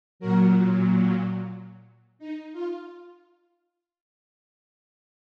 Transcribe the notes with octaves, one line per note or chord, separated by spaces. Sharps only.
A#2 F#3 F#4 A#4
D#4
F4